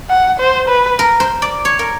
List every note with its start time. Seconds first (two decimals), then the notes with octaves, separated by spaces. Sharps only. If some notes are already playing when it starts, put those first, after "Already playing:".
0.10 F#5
0.40 C5
0.69 B4
0.99 A#4
1.20 C5
1.42 D5
1.65 C#5
1.79 A#4